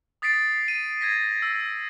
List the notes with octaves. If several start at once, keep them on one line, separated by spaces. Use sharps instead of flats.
D#6 A6 B6 C7 D7
D#7
G#6 A#6 B6
E6